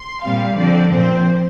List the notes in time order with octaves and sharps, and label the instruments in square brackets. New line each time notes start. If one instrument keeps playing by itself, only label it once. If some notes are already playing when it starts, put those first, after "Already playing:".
Already playing: [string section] C6
A#2 G3 C4 F5
D3 F3 C4 D5
A#2 F3 C4 C5